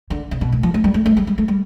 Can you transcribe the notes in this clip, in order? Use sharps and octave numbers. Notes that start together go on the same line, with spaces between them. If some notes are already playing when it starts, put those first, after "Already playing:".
D3
C3
B2
A2
F3
A3
G3
A3
A3
G3
G3
A3
G3